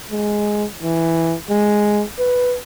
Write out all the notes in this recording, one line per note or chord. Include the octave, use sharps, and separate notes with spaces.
G#3
E3
G#3
B4